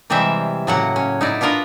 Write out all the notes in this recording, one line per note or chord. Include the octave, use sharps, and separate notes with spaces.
C3 E3 G3 G#3 C4 E5
A2 C#3 F#3 A#3 F#5
C#4
D#4 E4 D5
B3 D4 F4 A#4 B4